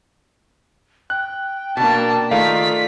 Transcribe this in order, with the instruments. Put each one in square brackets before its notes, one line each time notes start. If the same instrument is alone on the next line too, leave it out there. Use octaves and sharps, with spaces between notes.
[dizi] G5 [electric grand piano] F#6
[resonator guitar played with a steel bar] B2 D4 [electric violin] A#3 A5
[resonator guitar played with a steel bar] D#3 G#3 [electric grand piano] A3 D5 F5 [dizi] F4 [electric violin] B6